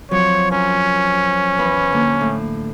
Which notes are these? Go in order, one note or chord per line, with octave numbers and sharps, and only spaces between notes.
F3 F#3 C4 C#5
C#4 A#4
E2 B5
D3 A#3
A2